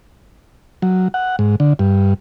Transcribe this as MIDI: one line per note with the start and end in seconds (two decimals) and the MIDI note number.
0.82 1.08 54
1.14 1.36 78
1.39 1.56 44
1.60 1.73 50
1.79 2.14 43